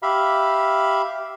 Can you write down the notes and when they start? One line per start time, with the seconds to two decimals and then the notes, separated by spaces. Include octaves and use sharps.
0.03 G4 E5 F5 B5